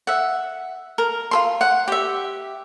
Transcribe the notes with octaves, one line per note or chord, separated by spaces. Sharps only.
E5 F#5
A#4
F4 A4 C6
F#5
G4 E5